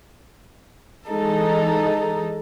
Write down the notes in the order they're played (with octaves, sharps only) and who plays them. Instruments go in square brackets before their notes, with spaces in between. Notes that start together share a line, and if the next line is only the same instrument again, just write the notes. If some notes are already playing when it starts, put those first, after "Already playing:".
[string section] E3 G#3 D#4 A4